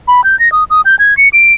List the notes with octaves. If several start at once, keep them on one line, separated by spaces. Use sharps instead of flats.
B5
G6
A#6
D#6
D#6
G6
G#6
C#7
D7